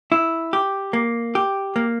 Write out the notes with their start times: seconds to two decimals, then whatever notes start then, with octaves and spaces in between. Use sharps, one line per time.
0.12 E4
0.53 G4
0.93 A#3
1.35 G4
1.76 A#3